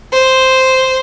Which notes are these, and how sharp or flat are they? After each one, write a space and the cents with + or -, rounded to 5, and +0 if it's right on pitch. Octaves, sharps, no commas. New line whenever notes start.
C5 -5